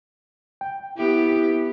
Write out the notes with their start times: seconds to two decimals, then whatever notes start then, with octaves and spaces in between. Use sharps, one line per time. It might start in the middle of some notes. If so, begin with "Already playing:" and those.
0.61 G5
0.98 B3 E4 G4